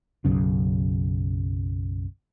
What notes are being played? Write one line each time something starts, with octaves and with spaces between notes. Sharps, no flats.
B1 F#2 C#3